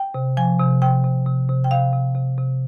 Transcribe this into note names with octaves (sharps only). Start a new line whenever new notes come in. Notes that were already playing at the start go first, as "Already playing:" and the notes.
Already playing: G5
C3
F3 G#5
C3
C3 G5
C3
C3
C3
G5
C3 F5
C3
C3
C3